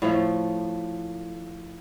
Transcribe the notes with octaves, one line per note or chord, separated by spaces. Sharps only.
A2 F3 A3